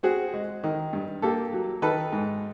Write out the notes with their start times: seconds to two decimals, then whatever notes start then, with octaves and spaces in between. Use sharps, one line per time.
0.03 C4 F#4 G#4
0.34 G#3
0.64 D#3
0.93 G2
1.22 A#3 G4 A4
1.53 F#3
1.82 D#3 A4 B4
2.13 G#2